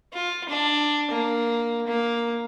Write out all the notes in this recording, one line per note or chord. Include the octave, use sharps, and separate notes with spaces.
F4
D4
A#3
A#3